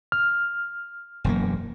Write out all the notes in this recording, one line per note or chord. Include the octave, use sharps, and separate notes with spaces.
F6
E1 F#2 A#3